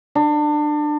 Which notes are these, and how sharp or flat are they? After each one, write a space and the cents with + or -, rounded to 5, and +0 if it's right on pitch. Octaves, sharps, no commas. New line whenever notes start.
D4 +25